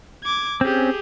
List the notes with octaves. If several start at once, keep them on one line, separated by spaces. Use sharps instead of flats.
D6 G#6
C4 C#4 G4 G#4